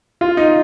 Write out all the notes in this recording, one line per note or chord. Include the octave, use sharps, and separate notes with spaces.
F4
D#4